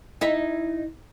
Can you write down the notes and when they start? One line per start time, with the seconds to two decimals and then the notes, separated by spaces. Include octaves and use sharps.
0.21 D#4 E4 E5